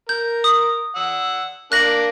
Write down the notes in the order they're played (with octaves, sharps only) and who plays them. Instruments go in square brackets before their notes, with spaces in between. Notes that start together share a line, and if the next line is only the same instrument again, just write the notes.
[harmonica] A#4 [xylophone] G6
[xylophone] D#6
[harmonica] F#5 E6
[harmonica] A#3 D4 [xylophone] F#6 A#6 F#7